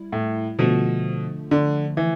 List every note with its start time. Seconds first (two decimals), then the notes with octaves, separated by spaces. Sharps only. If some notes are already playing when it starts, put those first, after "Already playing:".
Already playing: G3 E4
0.12 A2
0.59 B2 D3 F3 A3
1.51 D3
1.97 E3